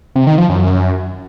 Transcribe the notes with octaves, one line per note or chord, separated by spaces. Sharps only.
C3
D#3
F3
F#2